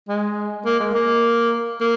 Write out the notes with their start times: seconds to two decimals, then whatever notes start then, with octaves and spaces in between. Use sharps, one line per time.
0.08 G#3
0.65 A#3
0.80 G#3
0.95 A#3
1.81 A#3